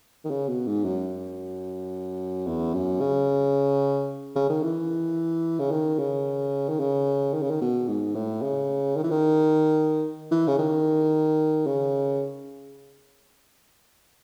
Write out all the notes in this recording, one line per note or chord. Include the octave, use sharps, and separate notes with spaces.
D#3
C#3
B2
G#2
F#2
E2
F#2
C#3
C#3
D#3
E3
C#3
D#3
C#3
D#3
C#3
D#3
C#3
D#3
B2
G#2
A2
C#3
D#3
E3
D#3
E3
C#3
D#3
C#3